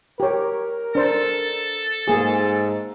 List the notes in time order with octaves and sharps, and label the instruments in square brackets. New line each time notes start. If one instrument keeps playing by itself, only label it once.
[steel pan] G4 C#5 [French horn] A#4
[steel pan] D4 C5 [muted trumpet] A4
[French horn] G#2 [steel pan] A#3 G#4